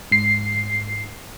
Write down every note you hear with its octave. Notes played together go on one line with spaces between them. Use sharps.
G#2 C7